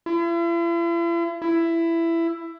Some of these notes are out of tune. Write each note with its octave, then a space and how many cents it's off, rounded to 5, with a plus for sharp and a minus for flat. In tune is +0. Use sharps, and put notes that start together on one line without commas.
E4 +45
E4 +15